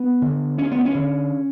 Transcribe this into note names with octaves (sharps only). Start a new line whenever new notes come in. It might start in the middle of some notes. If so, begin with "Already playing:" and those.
Already playing: B3
D3
D2 C#4
B3
C#4
D3